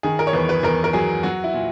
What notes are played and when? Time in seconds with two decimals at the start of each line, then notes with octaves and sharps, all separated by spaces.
0.03 D#3 G#4
0.19 A#4
0.27 C#5
0.33 E2 B4
0.49 B4
0.63 E2 A#4
0.84 A#4
0.93 F#3 G#4
1.23 F#3 F#4
1.44 E4
1.54 A#2